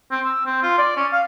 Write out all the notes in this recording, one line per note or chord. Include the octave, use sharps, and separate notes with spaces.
C4
E6
C4
F4
D5
C#4
F5